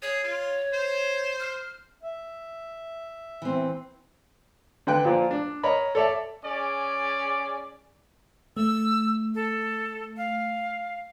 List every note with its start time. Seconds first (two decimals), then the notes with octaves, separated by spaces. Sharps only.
0.02 G#4 C#5
0.24 F4
0.73 C5
1.39 F6
2.03 E5
3.42 E3 C4
4.87 D3 B4 G5 F#6
5.05 A#2 F3
5.31 D4
5.63 A#4 C#5 D#5 B5
5.95 A4 C#5 D5 E5 A5
6.45 C#4 G#4 D5
8.57 A3 E6
9.35 A4
10.17 F5